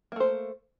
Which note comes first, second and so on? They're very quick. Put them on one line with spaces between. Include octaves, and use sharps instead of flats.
A#3 A3 C5